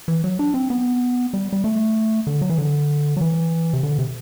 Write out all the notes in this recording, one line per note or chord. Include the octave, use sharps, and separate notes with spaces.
E3
F#3
D4
C4
B3
G3
G3
A3
D3
F#3
E3
D3
F#3
E3
C3
D3
C3